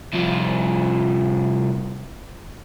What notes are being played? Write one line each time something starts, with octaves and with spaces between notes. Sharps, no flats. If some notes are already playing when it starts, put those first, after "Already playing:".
C2 F3